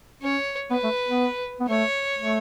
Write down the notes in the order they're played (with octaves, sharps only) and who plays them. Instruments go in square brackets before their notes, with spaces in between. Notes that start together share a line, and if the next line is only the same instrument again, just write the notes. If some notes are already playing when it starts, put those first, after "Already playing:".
[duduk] C#4 [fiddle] C#5
[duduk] B3 [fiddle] B4
[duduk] A3
B3
B3
[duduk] A3 [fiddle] C#5
[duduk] A3